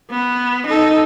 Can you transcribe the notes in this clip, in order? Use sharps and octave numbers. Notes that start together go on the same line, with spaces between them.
B3
D#4 A4